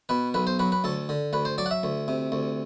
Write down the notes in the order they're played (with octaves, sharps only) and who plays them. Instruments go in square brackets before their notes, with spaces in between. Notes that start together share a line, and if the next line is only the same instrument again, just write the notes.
[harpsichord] B2 B4
B1 B4
C5
F#3 B4
B4
D2 A4
D3
D2 B4
C5
F#3 D5
F#5
E5
D2
C3
D2